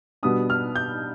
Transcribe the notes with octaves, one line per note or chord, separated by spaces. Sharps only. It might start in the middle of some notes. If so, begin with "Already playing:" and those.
B2 G3 B3 D4 D#6
F6
G6